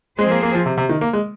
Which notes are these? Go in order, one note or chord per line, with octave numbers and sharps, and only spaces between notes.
F3 G#3 C4 G#4 C5
A#3
A#3
F3
C3
C3
D#3
A#3
G#3